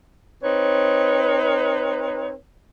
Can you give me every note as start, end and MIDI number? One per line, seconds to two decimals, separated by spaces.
0.43 2.34 60
0.43 2.34 63
0.43 2.34 71
0.43 2.34 73